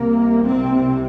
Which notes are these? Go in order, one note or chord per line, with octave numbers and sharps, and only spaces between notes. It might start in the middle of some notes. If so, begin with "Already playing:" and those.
Already playing: C2 C3 A#3
C4